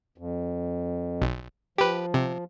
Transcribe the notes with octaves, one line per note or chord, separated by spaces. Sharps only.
F2
B1
F3 G4 B4
C3